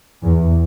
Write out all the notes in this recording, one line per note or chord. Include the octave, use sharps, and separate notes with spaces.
E2